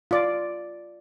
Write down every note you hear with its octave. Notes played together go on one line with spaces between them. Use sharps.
F4 D5